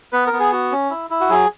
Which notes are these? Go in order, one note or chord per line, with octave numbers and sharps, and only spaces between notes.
B3 B4
A#4
B3
G#4
F#4
C#4
E4
E4
F#4
F#3 G#4